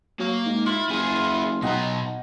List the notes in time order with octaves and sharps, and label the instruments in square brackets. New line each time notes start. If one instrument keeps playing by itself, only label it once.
[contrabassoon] F#3 [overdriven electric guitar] A#3 F5
[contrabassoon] G#2
[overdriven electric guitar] E4 [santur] F4
[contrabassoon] F#1 [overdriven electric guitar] E4 G#4
[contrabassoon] B1 [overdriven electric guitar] B2 A#5 [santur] D#5 F#5 G5